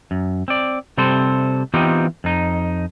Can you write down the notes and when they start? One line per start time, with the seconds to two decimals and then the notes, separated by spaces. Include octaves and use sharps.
0.11 F#2
0.48 C4 D5
0.98 C3 G3 C4 A4 C5
1.74 E3 B3 C4 D#4 F4 G4
2.24 F2 D#4